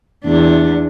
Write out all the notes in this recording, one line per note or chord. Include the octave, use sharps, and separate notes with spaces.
E2 D4